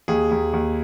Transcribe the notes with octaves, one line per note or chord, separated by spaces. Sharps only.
D#2 G#4
D#2
D#2